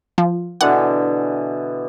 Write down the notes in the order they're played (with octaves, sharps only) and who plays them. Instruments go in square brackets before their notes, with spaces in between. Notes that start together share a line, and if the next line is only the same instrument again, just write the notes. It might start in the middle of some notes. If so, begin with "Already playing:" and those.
[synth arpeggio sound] F3
[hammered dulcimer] B2 D3 E3 [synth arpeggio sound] F#5